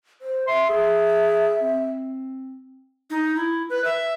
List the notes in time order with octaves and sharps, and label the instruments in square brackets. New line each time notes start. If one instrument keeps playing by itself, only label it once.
[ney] C5
[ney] E5 [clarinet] C6
[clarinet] G#4
C4
[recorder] D#4
E4
B4
E5